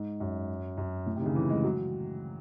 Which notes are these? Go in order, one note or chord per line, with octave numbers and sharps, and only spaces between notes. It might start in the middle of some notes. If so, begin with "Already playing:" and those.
Already playing: G#2
F#2
F#2
A2
C3
D#3
C#3
E3
G#3
F#3